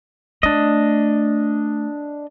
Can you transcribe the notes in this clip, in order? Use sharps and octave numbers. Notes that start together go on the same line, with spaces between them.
A3 D4 D#5